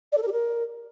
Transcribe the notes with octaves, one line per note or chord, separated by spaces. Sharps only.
D5
A4
A#4
G4
A#4